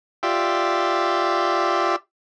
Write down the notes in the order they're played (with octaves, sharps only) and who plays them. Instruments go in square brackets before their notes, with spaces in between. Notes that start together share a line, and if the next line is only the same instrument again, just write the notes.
[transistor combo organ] F4 G4 D5 E5